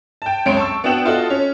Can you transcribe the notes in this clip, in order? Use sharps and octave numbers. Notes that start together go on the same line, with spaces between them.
G5 A5
C#2 F#2 C#5 C6 D7
A5 C#6 E6
B3 D4 F#4 G5 E7 F#7
F4 F#4 A4 D#5
C#4